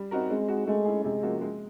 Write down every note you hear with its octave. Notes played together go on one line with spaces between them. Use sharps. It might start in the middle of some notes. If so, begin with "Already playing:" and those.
Already playing: G3
C4 D#4 F#4 A#4
G#3 C4
D#4 F#4
G#3 A3
C#4 E4 G#4
C3 G#3
F3 A#3 C#4 F#4
G#3